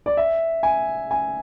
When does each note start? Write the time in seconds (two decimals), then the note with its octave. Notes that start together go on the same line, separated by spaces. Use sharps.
0.06 D5
0.17 E5
0.63 G#5
1.11 G#5